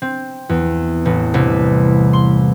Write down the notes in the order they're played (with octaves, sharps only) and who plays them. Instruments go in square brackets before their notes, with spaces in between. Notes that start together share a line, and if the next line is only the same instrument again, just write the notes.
[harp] C4
E2
A1
C2
C6